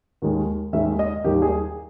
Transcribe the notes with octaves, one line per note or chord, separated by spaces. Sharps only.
D#2 D#3 G#3
D#2 D#3 G#3 E5
D#5
D#2 D#3 G3 G4
G#4